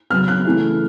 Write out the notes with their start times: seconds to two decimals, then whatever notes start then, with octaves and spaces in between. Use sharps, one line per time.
0.10 C#3 F#3 B3 F6
0.28 F#6
0.45 C#3 E3 A3